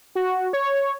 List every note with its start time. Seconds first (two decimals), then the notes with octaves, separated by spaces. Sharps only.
0.15 F#4
0.53 C#5